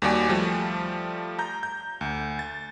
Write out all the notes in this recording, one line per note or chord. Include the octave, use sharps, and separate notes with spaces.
D#2 G3 F#4 G4 D5 G#5
F3 G3 A3
A#5 G6
G6
D2
A6